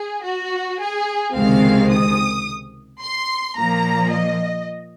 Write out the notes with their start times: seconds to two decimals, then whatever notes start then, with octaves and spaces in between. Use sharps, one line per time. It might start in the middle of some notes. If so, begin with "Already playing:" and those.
Already playing: G#4
0.25 F#4
0.80 G#4
1.35 C#2 C3 D#3 G#3 C4 F5
1.91 D#6
3.01 C6
3.57 A#2 F3 A#3 A#5
4.12 D#5